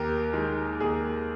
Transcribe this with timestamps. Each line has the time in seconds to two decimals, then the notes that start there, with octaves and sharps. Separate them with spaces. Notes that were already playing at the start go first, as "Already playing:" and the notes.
Already playing: D#2 G4 A#4
0.33 D#3 G#3
0.80 D#2 G#4